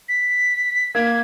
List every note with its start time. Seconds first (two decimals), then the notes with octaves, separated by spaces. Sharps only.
0.09 B6
0.95 A#3 G#6